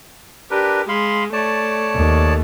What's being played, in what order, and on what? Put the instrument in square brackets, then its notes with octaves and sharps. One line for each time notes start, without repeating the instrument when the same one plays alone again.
[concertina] D4 A#4 B4 [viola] G4
[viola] G#3 [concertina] F5 B5 C6
[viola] A3 [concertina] C#5 D5 A5
[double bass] D#2